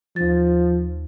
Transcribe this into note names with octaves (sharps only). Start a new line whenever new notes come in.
D#2 F3 A6